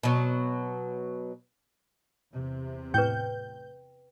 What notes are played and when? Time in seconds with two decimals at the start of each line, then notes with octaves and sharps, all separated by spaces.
0.03 B2 F#3
2.33 E2 C3
2.94 A2 B4 G5 G6